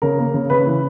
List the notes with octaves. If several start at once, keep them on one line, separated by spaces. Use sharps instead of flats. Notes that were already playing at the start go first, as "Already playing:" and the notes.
C#3 A#4
A#3
C#3
C#3 B4
E3